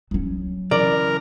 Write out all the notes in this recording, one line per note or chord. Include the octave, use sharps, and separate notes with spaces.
F#3 C#4
C#3 E3 A#4 D5